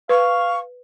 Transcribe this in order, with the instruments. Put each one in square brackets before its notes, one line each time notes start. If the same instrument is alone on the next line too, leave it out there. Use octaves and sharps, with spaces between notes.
[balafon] B4 [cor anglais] F5 [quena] C#6